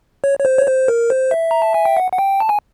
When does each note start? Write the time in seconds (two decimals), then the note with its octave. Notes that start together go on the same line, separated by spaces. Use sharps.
0.24 C#5
0.39 C#5
0.45 C5
0.58 C#5
0.67 C5
0.88 A#4
1.10 C5
1.31 E5
1.51 A#5
1.62 A5
1.74 G#5
1.85 G5
1.97 F#5
2.12 F#5
2.18 G5
2.40 A5
2.49 G#5